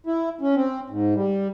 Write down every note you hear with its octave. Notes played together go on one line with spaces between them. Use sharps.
E4
C#4
C4
G#2
G3